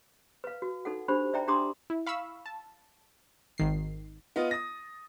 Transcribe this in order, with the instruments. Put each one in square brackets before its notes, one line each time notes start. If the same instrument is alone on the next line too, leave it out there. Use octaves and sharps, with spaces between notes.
[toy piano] B4 F5
F#4
D#4 A4 F#5
D4 G4 C5 B5
D#4 D5 E5 G5 A#5
D4 G4 A#5 C6 D6 D#6
[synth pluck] E4
F5 B5 C#6 E6
A5
G#1 D#3 C7
[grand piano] B3 F4 D#5
D#6 A#6